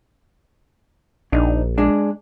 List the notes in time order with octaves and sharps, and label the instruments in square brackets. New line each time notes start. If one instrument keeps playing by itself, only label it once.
[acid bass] A#1 [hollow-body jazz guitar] D4 D#4
[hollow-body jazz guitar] G#3 D4